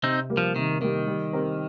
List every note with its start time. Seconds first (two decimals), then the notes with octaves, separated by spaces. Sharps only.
0.03 C3 C4 D#4
0.30 G3 A#3
0.37 F3
0.56 C3 D#3
0.80 D#3 G3 A#3
1.08 G3
1.33 C4 G4 A#4